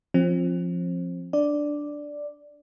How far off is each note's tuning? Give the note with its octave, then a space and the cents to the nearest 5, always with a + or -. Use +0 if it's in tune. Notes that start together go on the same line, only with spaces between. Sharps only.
F3 +0 C4 +25
D4 +0 D5 +0